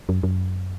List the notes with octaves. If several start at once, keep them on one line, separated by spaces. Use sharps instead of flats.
F#2
F#2